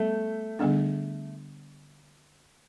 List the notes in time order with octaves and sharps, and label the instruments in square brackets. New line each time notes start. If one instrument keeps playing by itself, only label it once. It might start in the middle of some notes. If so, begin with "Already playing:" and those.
Already playing: [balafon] G3 B3 [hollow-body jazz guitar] A3
[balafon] D3 G3 B3 D4